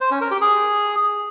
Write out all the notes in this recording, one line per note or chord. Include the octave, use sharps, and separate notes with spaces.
C5
C#4
A#4
G4
G#4